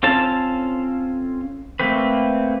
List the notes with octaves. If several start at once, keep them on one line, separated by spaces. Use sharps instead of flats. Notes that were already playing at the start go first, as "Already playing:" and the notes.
C4 C#4 F4 A4 A5
A3 A#3 C4 B4